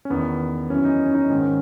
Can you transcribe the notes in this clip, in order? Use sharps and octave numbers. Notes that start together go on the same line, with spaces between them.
C#4
E2 D#3 B3
F#2 E3 C#4
D#4
C#4
D#4
G#2 D#3 C#4